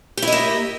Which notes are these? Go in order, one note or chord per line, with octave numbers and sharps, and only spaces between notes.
A#3 E4 G4 D#5